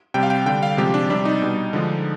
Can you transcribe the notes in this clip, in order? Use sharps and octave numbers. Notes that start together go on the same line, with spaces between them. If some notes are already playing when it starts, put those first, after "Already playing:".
C3 G3 G5
F5
G5
D3 G3 G5
F5
C3 F3 G#3 G4
D4
C3 G3 D4
D#4
B2 G3
D3 F3 G#3